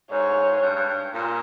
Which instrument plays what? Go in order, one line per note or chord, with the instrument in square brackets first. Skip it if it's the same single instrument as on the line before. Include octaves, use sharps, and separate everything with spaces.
[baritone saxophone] G#2 [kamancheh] C#5
[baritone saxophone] G2
G2
G2
A#2